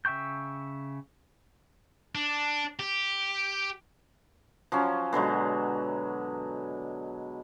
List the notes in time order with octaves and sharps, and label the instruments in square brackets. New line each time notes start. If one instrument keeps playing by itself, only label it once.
[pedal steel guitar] C#3 E5 G5 C#6 G6
[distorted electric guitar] D4
G4
[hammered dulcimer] F3 F#3 C#4
B2 D3 F#3 G#3